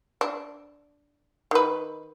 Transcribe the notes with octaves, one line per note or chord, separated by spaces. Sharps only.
D4
D#3 B4